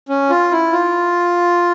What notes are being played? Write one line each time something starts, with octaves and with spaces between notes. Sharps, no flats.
C#4
F4
E4
F4